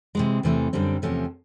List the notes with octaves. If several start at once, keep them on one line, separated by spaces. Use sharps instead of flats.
C3 E3 G#3
E2 C3 E3 A3
F#2 D3 G3 C4
E2 C3 F3 A3 C#4